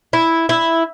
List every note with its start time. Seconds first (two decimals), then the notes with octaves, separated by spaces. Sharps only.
0.13 E4
0.49 E4